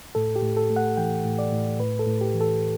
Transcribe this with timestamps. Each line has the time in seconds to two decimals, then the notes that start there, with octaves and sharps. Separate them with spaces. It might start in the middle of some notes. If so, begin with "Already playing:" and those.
0.15 A2 A4
0.36 G4
0.43 A2
0.57 A4
0.70 A3
0.76 F#5
0.97 E3 G5
1.25 A2
1.39 D5
1.52 A2
1.80 A2 B4
1.99 A4
2.07 A2
2.21 G4
2.34 E3
2.41 A4